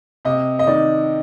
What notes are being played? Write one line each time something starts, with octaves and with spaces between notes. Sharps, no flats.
C3 D#5
D#5
D#3 D5